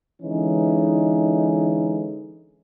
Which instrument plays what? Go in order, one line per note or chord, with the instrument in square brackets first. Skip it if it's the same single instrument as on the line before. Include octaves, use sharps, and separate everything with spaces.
[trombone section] D3 E3 G#3 C#4 D#4